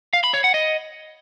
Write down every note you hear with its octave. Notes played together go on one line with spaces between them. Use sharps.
F5
B5
C#5
F#5
D#5